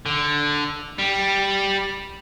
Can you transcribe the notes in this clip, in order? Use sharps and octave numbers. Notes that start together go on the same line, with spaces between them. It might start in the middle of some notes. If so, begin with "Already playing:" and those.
D3
G3